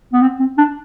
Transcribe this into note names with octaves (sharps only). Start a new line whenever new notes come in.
B3
C4
C4
D4